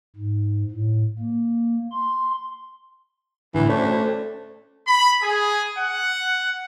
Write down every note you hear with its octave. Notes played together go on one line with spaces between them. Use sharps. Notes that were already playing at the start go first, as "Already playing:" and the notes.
G#2
A2
A#3
C6
A2 D3 E3
A3 C#4 C5 D5
B5
G#4
F#5